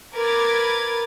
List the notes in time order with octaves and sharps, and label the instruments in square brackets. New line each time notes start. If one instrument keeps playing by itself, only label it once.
[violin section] A#4 B4 B5 D6 G#6 A6